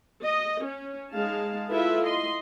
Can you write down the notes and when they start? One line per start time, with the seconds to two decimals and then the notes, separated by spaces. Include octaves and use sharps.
0.23 D#5
0.63 C#4
1.11 G#3 D#4 F5 A5
1.71 E4 F4 A4 B4 E5
2.05 D#5 C6